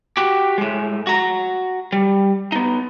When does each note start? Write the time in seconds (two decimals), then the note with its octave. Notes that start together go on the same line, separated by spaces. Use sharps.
0.17 F#4 G4
0.58 A2 G#3
1.07 F#4 A#5
1.93 G3
2.52 B3 D#4